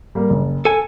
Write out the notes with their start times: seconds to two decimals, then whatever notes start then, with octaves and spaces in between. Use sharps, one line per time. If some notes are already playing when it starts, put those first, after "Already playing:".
0.15 G3 A#3
0.30 F#1
0.65 A4 G#5 D#7